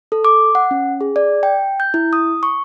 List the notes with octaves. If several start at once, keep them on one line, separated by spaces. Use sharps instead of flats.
A4
D6
F#5
C#4
G#4
D5
G5
G6
E4
D#6
C#6